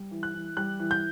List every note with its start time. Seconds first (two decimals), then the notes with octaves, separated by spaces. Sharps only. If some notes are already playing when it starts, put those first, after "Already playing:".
Already playing: G3
0.11 E3
0.23 F#6
0.34 E3
0.57 G3 F#6
0.80 E3
0.91 G6